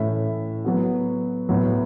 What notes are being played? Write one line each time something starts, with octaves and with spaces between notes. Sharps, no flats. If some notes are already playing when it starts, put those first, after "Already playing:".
Already playing: A2 E3 C#4 A4 E5
F#3 B3 F#4
A2 F#3 B3